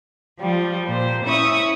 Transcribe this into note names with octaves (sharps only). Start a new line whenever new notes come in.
F3 G3 F4
A#2 C5
C#4 E4 E5 C#6 D#6